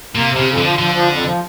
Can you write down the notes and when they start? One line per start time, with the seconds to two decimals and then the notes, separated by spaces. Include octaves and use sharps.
0.15 C3 A#3
0.31 C3
0.37 C#3
0.47 F2
0.58 D3
0.63 F3
0.78 D3 F3
0.95 F3
1.10 F2
1.26 F3